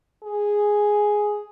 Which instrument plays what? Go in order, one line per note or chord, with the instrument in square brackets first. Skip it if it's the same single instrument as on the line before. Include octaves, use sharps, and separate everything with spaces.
[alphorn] G#4